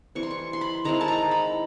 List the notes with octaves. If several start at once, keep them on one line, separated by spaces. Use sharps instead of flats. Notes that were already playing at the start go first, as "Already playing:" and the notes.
E3 G3 C4 C#6
C6
C#6
C6
B5
D#3 G#3 C4 E4 A#5
A5
A#5
B5